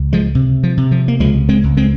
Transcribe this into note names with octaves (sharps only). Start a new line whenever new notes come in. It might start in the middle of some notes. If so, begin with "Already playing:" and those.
Already playing: C#2
F3 G#3
C3
F3
C3
F3
A#3
C#2 F3 G#3
G#3 C4
C#2
G#3 C4